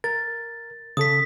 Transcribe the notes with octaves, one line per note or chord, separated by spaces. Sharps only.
A#4 A6
C#3 A4 D#6 B6